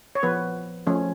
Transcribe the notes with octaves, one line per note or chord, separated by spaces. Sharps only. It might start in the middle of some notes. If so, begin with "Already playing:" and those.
C#5
F3 B3 B4
F3 A3 C#4